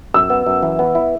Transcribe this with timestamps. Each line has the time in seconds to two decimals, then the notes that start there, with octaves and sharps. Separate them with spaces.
0.14 F#2 E6
0.30 B3
0.46 F#2
0.63 E3
0.79 B3
0.95 E4